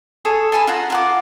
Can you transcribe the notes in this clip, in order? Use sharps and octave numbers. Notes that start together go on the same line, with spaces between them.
G#4 A4 C#5
A4 G#5 A5 B5
F4 F#5 A#5
F4 F#5 D6